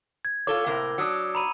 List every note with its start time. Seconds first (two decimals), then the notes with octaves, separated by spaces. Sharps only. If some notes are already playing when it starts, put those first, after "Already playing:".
0.25 G#6
0.47 F4 A4 C#5 D6 G7
0.66 A2 C3 A#3
0.98 F#3 D4 D#6 E6 C#7
1.35 A#5 B5 D#7